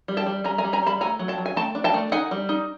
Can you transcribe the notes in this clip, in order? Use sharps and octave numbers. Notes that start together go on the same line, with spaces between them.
G3
G5 A5
G3
G3 G#5 A#5
G#5 A#5
G3
G#5 A#5
G3 A5 B5
A3 G#5 A#5
F#3
G5 A5
F#3
G#5
A3 G5 A5
D4
G5 A5
A3
D#4 F#5 G#5
G3
D#4